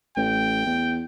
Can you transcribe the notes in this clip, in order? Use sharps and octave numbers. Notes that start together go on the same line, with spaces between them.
A1 G5
E2